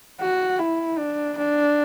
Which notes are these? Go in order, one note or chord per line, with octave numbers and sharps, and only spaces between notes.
F#4
E4
D4
D4